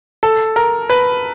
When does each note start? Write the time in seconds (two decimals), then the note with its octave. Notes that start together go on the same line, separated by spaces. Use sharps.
0.23 A4
0.56 A#4
0.90 B4